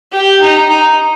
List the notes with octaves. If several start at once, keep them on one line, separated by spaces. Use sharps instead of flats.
G4
D#4
D#4